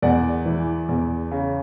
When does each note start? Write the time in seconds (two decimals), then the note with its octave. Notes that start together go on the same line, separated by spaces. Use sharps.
0.02 E2 D5 F#5
0.45 E3
0.89 E2
1.31 C#3